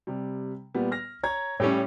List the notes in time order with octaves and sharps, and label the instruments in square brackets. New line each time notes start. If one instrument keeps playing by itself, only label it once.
[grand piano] C3 G3
A#2 G3 B3
F6 A#6
C#5 A#5 G#6
[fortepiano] A2 G3 C#4 [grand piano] C#5 G5